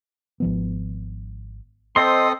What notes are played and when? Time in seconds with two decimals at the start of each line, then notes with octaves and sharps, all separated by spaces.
0.40 G#1 F3 B3
1.96 C4 A4 C5 D#5 C6 D#6